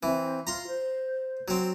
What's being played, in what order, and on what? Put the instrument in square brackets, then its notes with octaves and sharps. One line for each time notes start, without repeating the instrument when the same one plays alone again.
[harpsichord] E3 [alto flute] C4
[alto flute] F4 [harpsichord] A#5 C6
[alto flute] C5
[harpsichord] F#3 C4